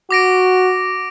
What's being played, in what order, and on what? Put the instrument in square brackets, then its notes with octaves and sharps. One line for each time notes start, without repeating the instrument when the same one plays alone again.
[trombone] F#4 [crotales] D6 A#6 D7